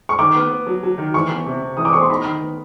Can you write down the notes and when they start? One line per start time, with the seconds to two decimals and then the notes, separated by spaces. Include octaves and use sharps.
0.09 C#6
0.19 D#3 D6
0.35 B3
0.51 B3
0.67 F#3
0.83 F#3
0.98 D#3
1.14 E3 C#6
1.30 E2
1.46 C3
1.62 C3
1.77 E3 D#6
1.85 D6
1.93 E2 C#6
2.01 C6
2.10 D#4 B5
2.25 D#3
2.41 B3